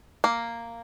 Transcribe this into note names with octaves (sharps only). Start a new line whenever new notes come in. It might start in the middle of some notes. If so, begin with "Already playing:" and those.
A#3